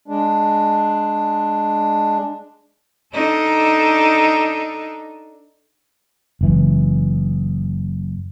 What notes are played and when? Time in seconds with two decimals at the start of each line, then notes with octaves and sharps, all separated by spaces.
0.08 G#3 D4
3.13 D4 D#4 A4
6.41 F#1 E3